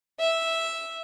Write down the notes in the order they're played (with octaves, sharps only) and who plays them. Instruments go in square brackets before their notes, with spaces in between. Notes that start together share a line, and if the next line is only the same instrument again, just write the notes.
[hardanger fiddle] E5